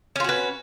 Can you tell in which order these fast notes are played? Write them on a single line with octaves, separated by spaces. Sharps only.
C#4 F4 F#4 B4